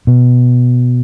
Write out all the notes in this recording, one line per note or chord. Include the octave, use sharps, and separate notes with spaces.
B2